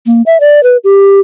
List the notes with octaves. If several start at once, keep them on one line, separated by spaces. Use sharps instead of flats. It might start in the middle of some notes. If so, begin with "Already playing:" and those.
A#3
E5
D5
B4
G4